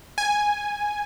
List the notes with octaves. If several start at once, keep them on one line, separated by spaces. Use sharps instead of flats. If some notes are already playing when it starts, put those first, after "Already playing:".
G#5